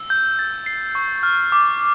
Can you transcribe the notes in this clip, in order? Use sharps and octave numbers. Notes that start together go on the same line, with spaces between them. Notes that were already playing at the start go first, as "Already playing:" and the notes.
Already playing: E6
G6
A6
C7
C#6
F6
D6